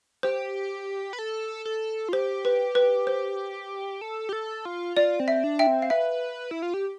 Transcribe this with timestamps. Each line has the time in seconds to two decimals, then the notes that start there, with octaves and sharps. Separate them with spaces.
0.23 G4 C5
1.13 B4
1.19 A4
1.65 A4
2.09 F4
2.13 G4 C5
2.45 B4
2.75 B4
3.07 C5
4.01 A4
4.29 G4
4.33 A4
4.65 F4
4.97 F4 D5
5.20 C4
5.28 E5
5.44 D4
5.59 E5 G5
5.67 C4
5.82 F5
5.90 B4 E5
6.51 E4
6.62 F4
6.74 G4